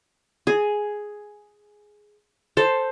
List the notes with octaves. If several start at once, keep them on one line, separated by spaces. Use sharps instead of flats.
G#4
A4 C5